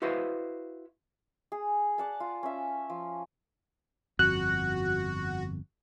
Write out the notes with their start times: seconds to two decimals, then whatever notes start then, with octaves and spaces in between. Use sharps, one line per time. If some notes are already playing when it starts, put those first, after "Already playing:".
0.02 E4 F#4 B4 C5 D#5 F5
1.52 G#4
1.98 D5 F#5 A5
2.20 F4
2.43 C#4 E5
2.90 F3
4.19 G1 F2 F#4 F#6